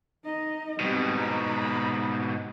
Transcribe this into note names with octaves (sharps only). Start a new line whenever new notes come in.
D#4 D#5
G#2 B2 G3 C4
A#5 B5